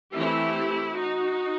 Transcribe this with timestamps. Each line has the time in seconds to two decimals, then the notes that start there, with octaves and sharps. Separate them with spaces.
0.16 E3 A3 C4 E4 G4
0.97 D#4 F#4